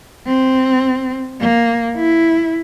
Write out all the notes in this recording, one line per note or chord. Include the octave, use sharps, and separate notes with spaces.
C4
A#3
E4